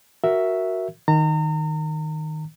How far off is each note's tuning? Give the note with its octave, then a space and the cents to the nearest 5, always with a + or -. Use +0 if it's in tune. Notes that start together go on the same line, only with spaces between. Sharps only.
F#4 +0 A#4 +0 E5 +0
D#3 +0 A#5 -35